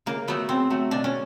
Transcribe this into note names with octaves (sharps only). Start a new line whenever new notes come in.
C#3 A#3
F#3 A3 B3
C#3 C4
F#3 A3
B2 D4
C#4